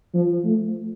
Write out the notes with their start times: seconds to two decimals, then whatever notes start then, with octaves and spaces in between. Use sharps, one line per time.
0.14 F3
0.44 A3